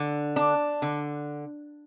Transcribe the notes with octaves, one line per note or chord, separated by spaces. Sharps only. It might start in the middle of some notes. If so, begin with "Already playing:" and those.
Already playing: D3
D4
D3